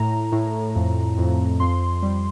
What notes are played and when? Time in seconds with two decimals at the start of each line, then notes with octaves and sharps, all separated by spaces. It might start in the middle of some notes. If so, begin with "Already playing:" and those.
Already playing: A2 A#5
0.32 A2
0.75 F2
1.18 F2
1.60 F2 C6
2.02 G3